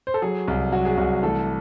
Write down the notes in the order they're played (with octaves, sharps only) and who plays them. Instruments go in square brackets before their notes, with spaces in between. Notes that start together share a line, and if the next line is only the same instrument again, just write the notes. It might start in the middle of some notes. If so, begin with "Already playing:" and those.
[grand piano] C5
A4
F#3 G#4
C2
F#3 F#4
G#4
C2 F#4
E3 A3 A4